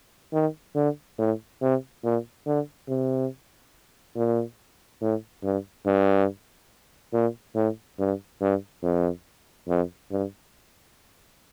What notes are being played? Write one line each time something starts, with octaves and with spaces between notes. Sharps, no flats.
D#3
D3
A2
C3
A#2
D3
C3
A#2
A2
G2
G2
A#2
A2
G2
G2
F2
F2
G2